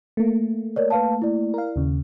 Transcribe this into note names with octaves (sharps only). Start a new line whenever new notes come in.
A3 A#3
A#4 C#5 D5
B4 F5 A5
E4 D5
A#4 F5
D#2 C#3